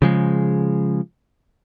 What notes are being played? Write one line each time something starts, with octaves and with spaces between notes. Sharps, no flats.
C#3 F3 G#3